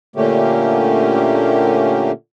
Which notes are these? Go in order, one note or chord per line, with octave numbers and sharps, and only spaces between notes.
A#2 D3 A3 A#3 C#4 G4